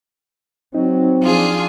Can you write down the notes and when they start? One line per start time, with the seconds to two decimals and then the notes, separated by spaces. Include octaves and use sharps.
0.75 F#3 C4 D#4
1.22 F3 D4 F4 G#4